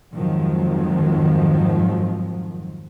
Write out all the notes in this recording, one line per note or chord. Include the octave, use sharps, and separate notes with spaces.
F2 G#2 D#3 F3 F#3